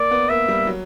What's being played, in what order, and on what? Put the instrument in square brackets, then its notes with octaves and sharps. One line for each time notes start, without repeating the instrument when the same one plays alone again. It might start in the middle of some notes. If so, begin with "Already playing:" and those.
Already playing: [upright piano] A#3 [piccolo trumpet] D5
[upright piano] B3
[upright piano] A#3 [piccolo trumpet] E5
[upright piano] G3
F#3